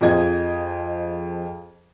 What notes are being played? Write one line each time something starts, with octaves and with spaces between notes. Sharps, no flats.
F2 F3 G#4 D#5 G#6